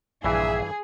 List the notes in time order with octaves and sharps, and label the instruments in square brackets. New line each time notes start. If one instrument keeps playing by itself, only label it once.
[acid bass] A#1 [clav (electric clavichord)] G2 E3 [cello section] G#4 [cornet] E5